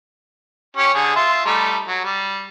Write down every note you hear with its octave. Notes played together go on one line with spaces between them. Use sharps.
C#4 G4 C#5
D3 G#4
F4 E5 C6
G3 A3 D#4
F#3
G3